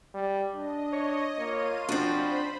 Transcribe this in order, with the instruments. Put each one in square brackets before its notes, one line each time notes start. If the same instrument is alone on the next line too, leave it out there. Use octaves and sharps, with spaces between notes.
[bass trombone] G3
[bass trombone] D4 [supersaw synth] D#5
[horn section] C#5
[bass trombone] A#3 [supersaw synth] F4 D#7 [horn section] C#5
[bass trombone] F2 [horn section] F3 F#4 [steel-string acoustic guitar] C4 D4 [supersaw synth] C5 B5